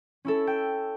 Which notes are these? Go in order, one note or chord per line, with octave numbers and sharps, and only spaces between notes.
C#4 E4 A4
G5